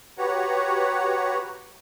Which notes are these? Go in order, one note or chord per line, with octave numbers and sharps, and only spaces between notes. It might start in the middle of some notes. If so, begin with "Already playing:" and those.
F#4 G4 B4 C#5 F#5 A#5